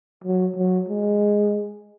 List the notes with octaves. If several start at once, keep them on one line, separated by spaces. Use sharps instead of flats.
F#3
F#3
G#3